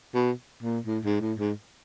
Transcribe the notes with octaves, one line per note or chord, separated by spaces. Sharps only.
B2
A#2
A2
G#2
A2
G#2